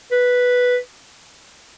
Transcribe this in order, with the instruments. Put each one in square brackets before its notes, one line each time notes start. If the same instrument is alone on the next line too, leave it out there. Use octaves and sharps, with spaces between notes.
[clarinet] B4